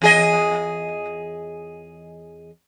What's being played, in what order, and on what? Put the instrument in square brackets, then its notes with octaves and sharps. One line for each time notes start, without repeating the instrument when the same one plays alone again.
[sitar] E2 G#4 D#5